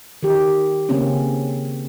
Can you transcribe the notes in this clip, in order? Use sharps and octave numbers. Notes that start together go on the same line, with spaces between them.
D#3 G4
C#3 A#3 C4 C#4